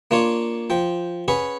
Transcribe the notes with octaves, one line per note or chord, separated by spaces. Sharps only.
A#3 D4 F4 C#5
F3 G5
C#4 G#4 B4 F#5